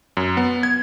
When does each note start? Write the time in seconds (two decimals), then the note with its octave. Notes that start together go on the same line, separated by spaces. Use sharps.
0.17 F#2
0.37 B3
0.63 G#6